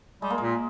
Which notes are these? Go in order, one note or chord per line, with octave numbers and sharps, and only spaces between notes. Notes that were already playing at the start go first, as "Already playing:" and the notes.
G3 G#3
A#3
A#2 G#3